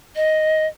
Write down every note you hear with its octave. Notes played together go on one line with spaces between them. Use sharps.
D#5